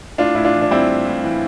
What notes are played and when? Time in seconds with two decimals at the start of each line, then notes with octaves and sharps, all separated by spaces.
0.18 A2 D4 F4
0.35 A2 E4
0.45 D4 F4
0.54 E3
0.61 D4
0.71 G3 C4 E4
0.89 A2
1.06 A2
1.24 E3